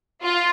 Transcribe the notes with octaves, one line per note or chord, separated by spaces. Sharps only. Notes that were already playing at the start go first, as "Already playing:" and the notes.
F4